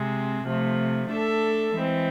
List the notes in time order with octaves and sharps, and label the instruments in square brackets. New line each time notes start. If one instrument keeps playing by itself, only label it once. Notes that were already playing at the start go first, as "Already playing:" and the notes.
Already playing: [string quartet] C3 G#3 C4
C3 F3 A3
A3 D4 A4 E5
E3 G#3 C4